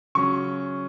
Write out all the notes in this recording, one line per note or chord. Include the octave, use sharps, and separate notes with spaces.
C#3 F#3 C#4 C#6